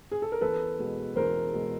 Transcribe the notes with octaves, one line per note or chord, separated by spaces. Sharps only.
G#4
A4
A#4
E2 A4 B4
B2 G#3
E2 A#4 C5
B2 G#3